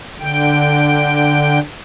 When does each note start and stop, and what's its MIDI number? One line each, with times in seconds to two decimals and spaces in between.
0.20 1.59 50
0.20 1.59 79